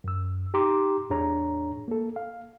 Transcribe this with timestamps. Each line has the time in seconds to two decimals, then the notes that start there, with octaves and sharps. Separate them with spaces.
0.04 F#2 E6
0.54 D#4 G4 A#5 C6 D6
1.10 E2 A2 D4 G#4 C#5 A#5
1.88 A#3 A4
2.16 F5